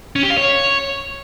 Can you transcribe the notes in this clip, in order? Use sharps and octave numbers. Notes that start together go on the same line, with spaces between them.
C#4
G4
F5
C#5